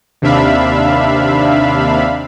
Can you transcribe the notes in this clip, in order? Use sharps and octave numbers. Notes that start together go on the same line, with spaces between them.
D#2 C3 D4 E5 F5 B5